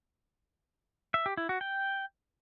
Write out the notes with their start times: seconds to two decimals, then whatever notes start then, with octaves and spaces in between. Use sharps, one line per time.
1.14 E5
1.26 G4
1.37 E4
1.49 F#4
1.61 G5